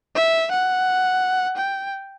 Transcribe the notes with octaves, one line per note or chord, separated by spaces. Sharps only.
E5
F#5
G5